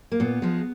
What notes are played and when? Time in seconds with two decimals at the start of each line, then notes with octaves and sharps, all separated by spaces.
0.12 A#3
0.20 A#2 B3
0.42 F3 G#3